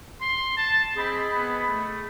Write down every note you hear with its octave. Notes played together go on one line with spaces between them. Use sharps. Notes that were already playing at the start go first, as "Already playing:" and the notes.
C6
A5
C4 G#4 D#5 B5
B3
A3